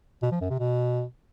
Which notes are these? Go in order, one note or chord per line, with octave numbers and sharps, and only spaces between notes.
B2
F3
F#2
C3
B2